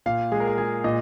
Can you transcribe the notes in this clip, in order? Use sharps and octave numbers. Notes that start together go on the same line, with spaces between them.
A#2 F5
G#3 G#4
A#4
G#4
G#3 G#4
A#2 D#5